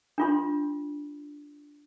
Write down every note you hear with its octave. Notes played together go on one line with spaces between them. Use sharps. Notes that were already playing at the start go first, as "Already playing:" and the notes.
D4 F4 C6